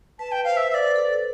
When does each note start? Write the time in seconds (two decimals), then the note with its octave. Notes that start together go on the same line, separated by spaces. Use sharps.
0.19 B4 A5
0.32 G5
0.44 C5 F5
0.57 E5
0.70 B4 E5
0.74 D5
0.96 A4